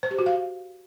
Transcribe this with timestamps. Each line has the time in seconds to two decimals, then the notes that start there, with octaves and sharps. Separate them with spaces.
0.03 C5
0.11 G4
0.19 F#4
0.26 F5